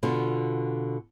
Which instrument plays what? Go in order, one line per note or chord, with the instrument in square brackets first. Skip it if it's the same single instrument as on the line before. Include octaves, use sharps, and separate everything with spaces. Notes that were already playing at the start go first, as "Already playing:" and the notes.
[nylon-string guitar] B2 D3 F4